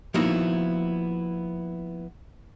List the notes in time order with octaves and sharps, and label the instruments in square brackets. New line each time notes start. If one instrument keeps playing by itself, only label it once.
[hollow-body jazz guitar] F3 A#3 B3 D#4 E4 F#4